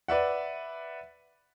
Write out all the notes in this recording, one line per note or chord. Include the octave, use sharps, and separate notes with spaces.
B4 D5 E5 F#5